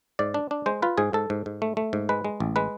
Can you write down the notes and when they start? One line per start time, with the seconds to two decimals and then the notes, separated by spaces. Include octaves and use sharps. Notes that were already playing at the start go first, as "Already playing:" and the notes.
0.19 G#2 D5
0.34 D4
0.51 D4
0.66 G#3 C5
0.82 F4 B4
0.98 G#2 G#4
1.13 G#2 A4
1.30 G#2
1.46 G#2
1.62 A3
1.77 A3
1.93 G#2
2.09 G#3 B4
2.24 G#3
2.40 A1
2.56 G#3 B4